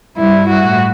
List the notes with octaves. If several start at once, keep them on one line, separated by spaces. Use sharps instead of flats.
G2 E4
F#4
A2